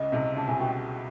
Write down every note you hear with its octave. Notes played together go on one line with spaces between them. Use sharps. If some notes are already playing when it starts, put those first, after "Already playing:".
Already playing: C#2 C#3 D#5
C2 C3
C#2 C#3 A5
C2 C3 G#5
B2 G5